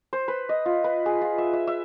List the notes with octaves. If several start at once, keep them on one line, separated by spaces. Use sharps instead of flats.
C5
B4
D#5
F4
B4
G#4
F4
E5
E5
E5